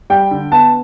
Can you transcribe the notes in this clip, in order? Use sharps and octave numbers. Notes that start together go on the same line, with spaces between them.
G3 G5
D3
B3 A5